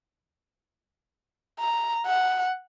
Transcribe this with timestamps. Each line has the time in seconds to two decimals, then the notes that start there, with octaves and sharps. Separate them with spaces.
1.60 A#5
2.06 F#5